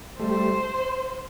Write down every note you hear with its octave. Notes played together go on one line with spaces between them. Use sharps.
G3 A3 C5